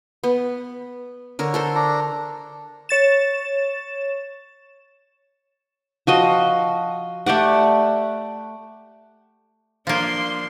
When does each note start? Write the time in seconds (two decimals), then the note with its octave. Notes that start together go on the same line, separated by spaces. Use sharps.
0.24 B3
1.39 D3 A#4 C#5
1.54 A4 A#4 C5
1.75 D4 A#5
2.89 C#5 A6 E7
6.07 F3 F#4 D#5
7.26 A3 G4 D5 F#5
9.87 F3 A#3 D4 C6